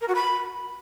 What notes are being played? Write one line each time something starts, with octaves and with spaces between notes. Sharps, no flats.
A#4
F#4
B5